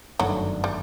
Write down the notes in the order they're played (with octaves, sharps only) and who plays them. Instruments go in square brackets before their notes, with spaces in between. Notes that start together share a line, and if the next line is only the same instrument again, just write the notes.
[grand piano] G1 F#2 D#3 A3 D4 [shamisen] F#3
[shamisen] G3